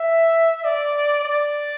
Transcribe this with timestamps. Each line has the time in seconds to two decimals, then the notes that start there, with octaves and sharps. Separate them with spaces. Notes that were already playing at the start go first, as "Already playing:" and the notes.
Already playing: E5
0.64 D5
1.23 D5